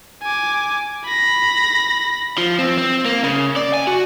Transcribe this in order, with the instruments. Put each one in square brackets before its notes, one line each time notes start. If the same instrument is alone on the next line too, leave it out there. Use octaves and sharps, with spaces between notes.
[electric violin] G#5 D6
B5 A#6
[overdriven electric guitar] F3
C4
C4
A#3
C#3
D5
G#5
F#4